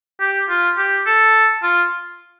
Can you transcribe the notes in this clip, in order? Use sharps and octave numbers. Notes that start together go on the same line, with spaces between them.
G4
F4
G4
A4
F4